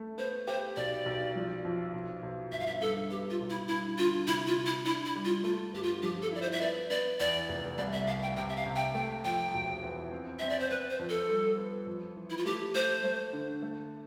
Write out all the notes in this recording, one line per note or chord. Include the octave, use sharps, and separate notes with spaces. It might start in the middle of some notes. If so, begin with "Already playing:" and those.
Already playing: A3
B3 C5
G4 C5
B1 D5
B1
F3
F2
B1
B1
G1 E5
F5
E5
G2 A4
B3 G4
F4
B1
E4
G2 E4
D3 F4
C3 E4
F4
C3
E4
D4 E4
E4
G3
F4
A3 F4
G1 G4
F4
F3 G4
A4
E4 D5
C5
E5
B3 D5
B3 D5
E2 D5
F1
C2 D5
E5
C2 F5
G5
C3 G5
E5
F5
C3
G5
A3 G5
F2 G5
E1
E2
C4
C4 E5
D5
C5
B3 B4
C5
F2
A4
G3
B3
F2
E3
E4
F4
A3 G4
A3 C5
A3
D3
A3